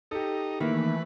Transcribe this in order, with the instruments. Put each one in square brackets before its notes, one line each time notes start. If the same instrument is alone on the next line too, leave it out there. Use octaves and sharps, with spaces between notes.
[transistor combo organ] D#4 [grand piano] G4 A4
[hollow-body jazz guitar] D#3 A#3 [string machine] E3 A3 [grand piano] E4 [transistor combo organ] B4